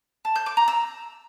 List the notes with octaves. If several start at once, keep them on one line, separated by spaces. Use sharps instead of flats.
A5
G6
D6
A#5
E6